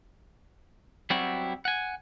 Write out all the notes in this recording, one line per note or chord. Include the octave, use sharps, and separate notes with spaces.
F#3 G3 B3 C4 E4 F#4
F#5 G#5